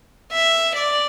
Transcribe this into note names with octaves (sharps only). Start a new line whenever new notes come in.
E5
D5